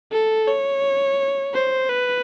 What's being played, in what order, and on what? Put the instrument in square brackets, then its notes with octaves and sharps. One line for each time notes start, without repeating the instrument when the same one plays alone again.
[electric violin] A4
C#5
C5
B4